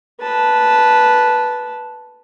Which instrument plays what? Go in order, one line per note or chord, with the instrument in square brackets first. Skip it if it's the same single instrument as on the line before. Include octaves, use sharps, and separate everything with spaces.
[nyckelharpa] B4 A5